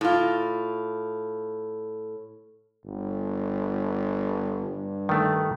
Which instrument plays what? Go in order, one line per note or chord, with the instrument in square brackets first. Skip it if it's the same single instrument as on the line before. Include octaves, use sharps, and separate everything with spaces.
[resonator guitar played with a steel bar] A2 F4
[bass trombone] G1
G2
[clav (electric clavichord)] D#3 A3